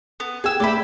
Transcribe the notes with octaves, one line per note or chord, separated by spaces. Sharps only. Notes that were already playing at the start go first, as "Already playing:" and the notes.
B3
G#4 G5 G#5 E6
A3 D5 E5 G5 B5